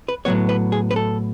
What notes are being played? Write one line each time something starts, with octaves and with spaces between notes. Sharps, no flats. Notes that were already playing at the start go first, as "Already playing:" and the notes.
B4
A2 F#3 B3 C#5
B4
G#4
B4
A4